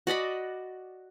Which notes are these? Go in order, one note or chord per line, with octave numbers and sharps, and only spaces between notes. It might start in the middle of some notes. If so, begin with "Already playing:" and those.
F#4 D5 D#5 B5